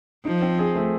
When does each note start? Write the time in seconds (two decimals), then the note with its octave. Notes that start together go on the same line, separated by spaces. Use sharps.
0.25 F3 D#4
0.42 C4
0.59 G#4
0.75 A3